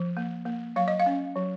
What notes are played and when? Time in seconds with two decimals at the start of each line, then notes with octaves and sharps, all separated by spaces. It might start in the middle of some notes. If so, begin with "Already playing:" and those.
Already playing: F3
0.17 A#3
0.46 A#3
0.76 F#3 F5
0.88 D#5
1.00 F5
1.06 C#4
1.36 F#3